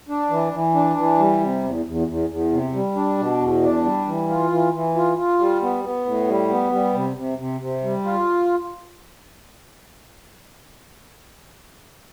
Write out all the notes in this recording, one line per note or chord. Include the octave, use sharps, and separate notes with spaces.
D4
E3
E3
D4
E3
G3
C3
E2
E2
E2
E2
C3
G3
D4
B2
E2
D4
G3
E3
F4
E3
E3
F4
F4
G3
B3
B3
A2
G3
B3
G3
C3
C3
C3
C3
G3
F4